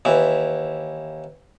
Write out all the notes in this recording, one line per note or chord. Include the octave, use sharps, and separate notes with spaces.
D#2 E3